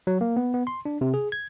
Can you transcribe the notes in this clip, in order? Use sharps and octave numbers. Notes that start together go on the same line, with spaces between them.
F#3
A#3
B3
B3
C6
D4
C3
G#4
G#6